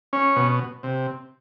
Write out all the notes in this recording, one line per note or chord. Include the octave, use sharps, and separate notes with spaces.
C#4
B2
C3